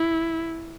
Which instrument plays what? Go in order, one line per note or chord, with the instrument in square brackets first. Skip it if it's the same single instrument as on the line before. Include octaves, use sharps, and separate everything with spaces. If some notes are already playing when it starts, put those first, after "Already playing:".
Already playing: [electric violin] E4